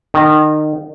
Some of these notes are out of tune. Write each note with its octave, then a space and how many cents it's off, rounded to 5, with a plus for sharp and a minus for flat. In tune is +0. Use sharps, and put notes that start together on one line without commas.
D#3 -25